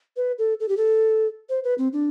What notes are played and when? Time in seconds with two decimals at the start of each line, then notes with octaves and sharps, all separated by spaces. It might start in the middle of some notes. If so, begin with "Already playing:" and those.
0.17 B4
0.38 A4
0.60 A4
0.69 G4
0.77 A4
1.49 C5
1.64 B4
1.78 C4
1.93 D4